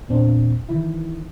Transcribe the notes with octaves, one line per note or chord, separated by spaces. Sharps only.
E2 A#2 C4 D4
D#3 E3 E4